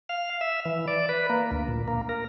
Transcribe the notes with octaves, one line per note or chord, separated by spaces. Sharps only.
F5
E5
E3
D5
B4
A#3
D2
A#2
A#3
A#4